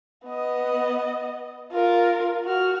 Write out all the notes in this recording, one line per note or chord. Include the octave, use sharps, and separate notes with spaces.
B3 D#5
F4 A#4
F#4 F6